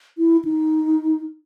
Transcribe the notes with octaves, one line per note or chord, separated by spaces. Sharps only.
E4
D#4